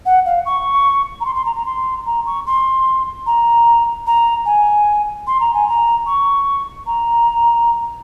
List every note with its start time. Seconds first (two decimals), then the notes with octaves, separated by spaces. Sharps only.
0.05 F#5
0.25 F5
0.45 C#6
1.20 A#5
1.25 C6
1.35 C6
1.45 A#5
1.55 A#5
1.66 C6
2.06 A#5
2.26 C#6
2.46 C6
3.26 A#5
4.06 A#5
4.45 G#5
5.27 C6
5.40 A#5
5.54 G#5
5.68 A#5
6.06 C#6
6.86 A#5